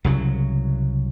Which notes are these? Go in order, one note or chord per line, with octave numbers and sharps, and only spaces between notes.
C2 C#3 F#3